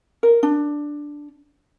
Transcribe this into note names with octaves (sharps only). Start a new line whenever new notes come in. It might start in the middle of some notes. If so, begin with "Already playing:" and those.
A#4
D4